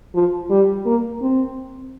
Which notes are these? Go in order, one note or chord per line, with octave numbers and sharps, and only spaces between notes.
F3
G3
A#3
C4